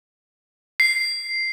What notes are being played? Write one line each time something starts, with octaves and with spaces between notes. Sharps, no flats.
C7